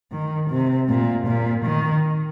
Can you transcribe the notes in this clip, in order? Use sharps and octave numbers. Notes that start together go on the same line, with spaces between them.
D#3
C3
A#2
A#2
D#3